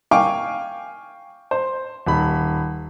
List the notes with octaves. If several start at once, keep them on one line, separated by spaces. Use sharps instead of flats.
F5 G5 G#5 C#6 D6
C5
D#1 B5